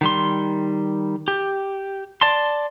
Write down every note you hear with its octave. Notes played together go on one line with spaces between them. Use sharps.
D#3 G3 C6
G4
D5 A5 C6